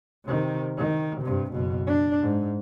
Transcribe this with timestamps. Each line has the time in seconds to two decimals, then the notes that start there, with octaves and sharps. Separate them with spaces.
0.25 C3 D#3
0.78 D#3
1.21 G2 C3
1.52 F#1 B2
1.87 D4
2.21 G#2